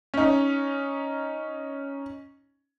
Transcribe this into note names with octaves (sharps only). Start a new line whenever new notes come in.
C#4 D#4